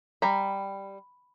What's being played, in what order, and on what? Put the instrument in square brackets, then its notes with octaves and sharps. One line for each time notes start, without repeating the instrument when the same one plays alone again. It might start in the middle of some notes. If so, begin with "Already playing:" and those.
[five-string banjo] G3 A#5 [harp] B5